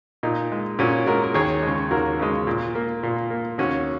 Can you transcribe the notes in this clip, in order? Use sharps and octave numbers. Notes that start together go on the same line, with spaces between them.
A#2 D#4
G#3
A#2 C#4 F#4
G#3 F#4 A#4
A#4
D#2 G#4 C#5
C#3 G#3
D#2 F#4 A#4
C#3 G#3
A#2
A#3
A#2
A#3
D#2 C#4 F#4